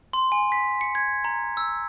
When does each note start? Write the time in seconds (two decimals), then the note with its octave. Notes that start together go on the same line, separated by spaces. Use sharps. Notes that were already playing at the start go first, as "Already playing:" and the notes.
0.13 C6
0.32 G#5
0.52 B6
0.81 C#7
0.95 G#6
1.25 A#5
1.57 E6